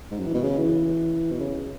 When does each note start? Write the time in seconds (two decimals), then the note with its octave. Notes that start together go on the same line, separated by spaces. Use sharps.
0.11 G#2
0.19 F#2
0.27 E3
0.34 B2
0.43 C#3
0.59 E3
1.32 B2
1.40 C#3